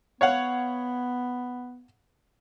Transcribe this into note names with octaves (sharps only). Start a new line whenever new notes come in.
B3 C#5 F5 F#5